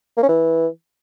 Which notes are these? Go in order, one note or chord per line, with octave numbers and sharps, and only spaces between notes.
A#3
C#4
E3